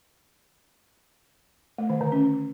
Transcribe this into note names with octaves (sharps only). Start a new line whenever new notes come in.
A3
D#3
D3
C#4